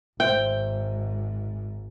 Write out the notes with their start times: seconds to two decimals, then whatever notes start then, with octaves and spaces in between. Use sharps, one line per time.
0.20 G#1 G#2 C5 E5 G5